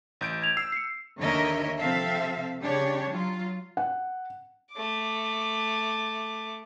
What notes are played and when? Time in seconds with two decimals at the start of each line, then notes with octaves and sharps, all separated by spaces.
0.21 A1 G6 D7
0.42 G#6 F7
0.57 E6 C7
0.72 C7 C#7
1.18 D#2 D3 A#4 C#5 D#5 E5
1.79 C3 F3 C4 A4 E5 F5
2.61 C#3 D4 G4 C#5
3.10 F#3 F4
3.77 F#5
4.72 A3 D6